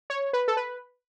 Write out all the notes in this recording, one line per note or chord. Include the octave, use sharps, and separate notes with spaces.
C#5
B4
A4
B4